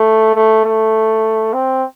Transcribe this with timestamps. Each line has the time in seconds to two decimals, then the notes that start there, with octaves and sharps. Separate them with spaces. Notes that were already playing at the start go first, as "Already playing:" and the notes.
Already playing: A3
0.35 A3
0.65 A3
1.53 C4